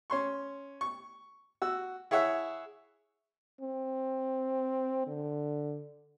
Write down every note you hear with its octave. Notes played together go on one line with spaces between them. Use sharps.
C#4 C6 C#6
C#6
F#4 E6
E4 G#4 C#5 E5 F#5
C4
D3